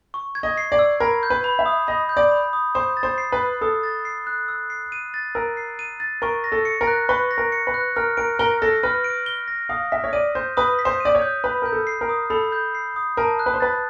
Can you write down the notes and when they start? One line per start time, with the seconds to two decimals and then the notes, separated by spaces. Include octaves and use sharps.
0.14 C#6
0.35 G#6
0.43 D#5
0.58 C7
0.72 D5
0.79 E6
1.00 A#4 B5
1.23 G6
1.30 B4
1.44 B5
1.59 E5
1.66 D#6
1.87 D#5 B5
2.09 G6
2.17 D5
2.31 B5
2.53 D#6
2.75 C5 D#6
2.97 A6
3.03 C5
3.18 C7
3.32 B4
3.40 F#6
3.61 A4 D#6
3.83 A6
4.05 C7
4.27 F#6
4.48 E6
4.70 C7
4.92 D#7
5.14 A6
5.35 A#4 E6
5.57 C7
5.79 D#7
6.00 A6
6.22 A#4 C#6
6.44 A#6
6.52 A4
6.65 C#7
6.81 A#4
6.87 F#6
7.09 B4 C#6
7.31 A#6
7.38 A#4
7.52 C#7
7.67 B4
7.74 F#6
7.96 A#4 F6
8.17 A#4 D7
8.39 A#4 G7
8.62 A4 A#6
8.83 B4 F6
9.04 D7
9.26 G7
9.48 A#6
9.69 F5 D#6
9.92 E5 B6
10.04 C#5
10.13 D5 D#7
10.35 C5 G6
10.57 B4 D#6
10.79 B6
10.85 C5
11.00 D5 D#7
11.15 C#5
11.22 G6
11.44 B4 B5
11.62 A#4 G6
11.72 A4
11.87 C7
12.01 A#4
12.09 D#6
12.30 A4 B5
12.52 G6
12.75 C7
12.96 D#6
13.17 A#4 A5
13.39 F#6
13.46 B4
13.54 C5
13.60 B4 A6